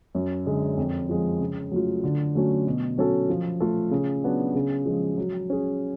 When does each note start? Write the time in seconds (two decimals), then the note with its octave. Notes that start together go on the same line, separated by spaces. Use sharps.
0.15 F#2
0.46 D3 G#3
0.77 F2
1.09 F3 G#3
1.41 C#3
1.71 F#3 A3 F4
2.04 D3
2.35 F#3 A3 C#4
2.67 B2
2.98 F#3 C#4 F#4 A4
3.30 F3
3.60 A3 F4 A4
3.91 C#3
4.24 F#3 B3 D4 F#4
4.55 C#3
4.86 F3 G#3
5.18 F#3
5.50 C#4 G#4